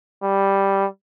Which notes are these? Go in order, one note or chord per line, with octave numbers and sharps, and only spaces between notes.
G3